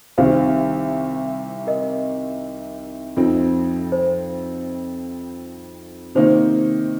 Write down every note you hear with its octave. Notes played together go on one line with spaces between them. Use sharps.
C2 C3 D#3 C5 F5
A#4 D#5
F2 F3 C4 D#4
C5
C3 D#3 A#3 D#4 C5